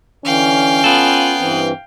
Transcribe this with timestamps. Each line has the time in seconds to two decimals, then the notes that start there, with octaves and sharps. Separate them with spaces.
0.25 D3 E3 C#4 F5 G5
0.84 B3 F4 A4
1.39 G2 E3 C4